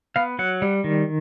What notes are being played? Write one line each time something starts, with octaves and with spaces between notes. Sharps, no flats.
B3 F5
F#3 F#5
G3
D#3